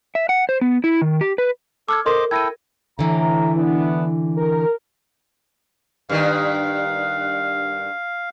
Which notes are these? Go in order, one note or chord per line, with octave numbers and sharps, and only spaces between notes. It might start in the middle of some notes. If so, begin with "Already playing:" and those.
E5
F#5
C5
B3
E4
D#3
G4
B4
A4 D6 F6 G#6
A4 A#4 C5 D#5 C6 D6
E4 A4 G5 G#6 A#6 D#7
A2 D3 E3 E5 A#5
B3 D4 E4
A#4
G2 D#3 F5